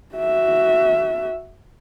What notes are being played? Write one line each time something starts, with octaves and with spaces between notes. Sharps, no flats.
F#4 E5